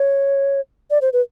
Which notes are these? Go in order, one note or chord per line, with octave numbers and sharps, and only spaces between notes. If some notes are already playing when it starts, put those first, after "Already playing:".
Already playing: C#5
D5
C5
B4